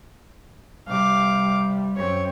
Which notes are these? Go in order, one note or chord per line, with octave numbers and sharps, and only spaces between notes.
C3 G3 F5 D6
F#2 C4 C#5